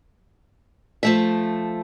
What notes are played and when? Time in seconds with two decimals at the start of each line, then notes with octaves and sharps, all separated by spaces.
1.03 F3 A3 E5